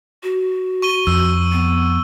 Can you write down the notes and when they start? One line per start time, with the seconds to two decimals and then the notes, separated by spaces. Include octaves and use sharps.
0.23 F#4
0.82 C#6 D#7 G7
1.07 F2 E6
1.52 B3